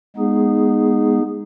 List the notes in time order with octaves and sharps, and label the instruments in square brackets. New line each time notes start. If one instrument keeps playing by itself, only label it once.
[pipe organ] G#3 B3 D#4 G#4